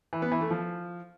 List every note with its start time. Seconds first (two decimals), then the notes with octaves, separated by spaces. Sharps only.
0.13 E3
0.22 B3
0.32 E3
0.41 A3
0.51 F3